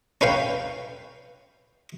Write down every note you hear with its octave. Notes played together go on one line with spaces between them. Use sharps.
C#4 B4 F5 G5